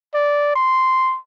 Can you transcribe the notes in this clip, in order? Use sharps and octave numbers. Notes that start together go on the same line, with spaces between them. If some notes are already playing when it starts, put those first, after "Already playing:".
D5
C6